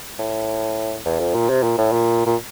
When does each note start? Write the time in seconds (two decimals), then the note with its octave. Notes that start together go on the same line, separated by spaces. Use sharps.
0.19 A2
1.06 E2
1.20 F2
1.35 A#2
1.50 C3
1.63 A#2
1.78 A2
1.93 A#2
2.26 A#2